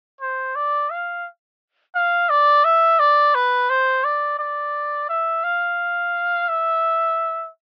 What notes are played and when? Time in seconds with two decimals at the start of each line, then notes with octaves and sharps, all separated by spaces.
0.21 C5
0.56 D5
0.90 F5
1.95 F5
2.30 D5
2.65 E5
2.99 D5
3.35 B4
3.70 C5
4.04 D5
4.39 D5
5.09 E5
5.44 F5
6.48 E5